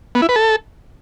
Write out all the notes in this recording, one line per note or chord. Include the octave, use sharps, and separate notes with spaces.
B3
E4
B4
A4